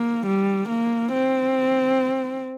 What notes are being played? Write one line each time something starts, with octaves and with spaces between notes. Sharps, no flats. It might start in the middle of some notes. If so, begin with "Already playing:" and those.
Already playing: A#3
G3
A#3
C4